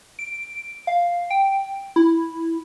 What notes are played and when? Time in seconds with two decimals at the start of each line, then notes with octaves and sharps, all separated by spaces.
0.19 D7
0.87 F5
1.30 G5
1.96 E4